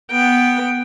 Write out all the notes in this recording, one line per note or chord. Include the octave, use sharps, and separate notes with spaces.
B3 G5